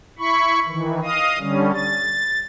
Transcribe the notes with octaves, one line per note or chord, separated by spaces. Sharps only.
E4 B5 C#6
D#3 E3
D#5 F5 D#6
D3 G3 C#4
A6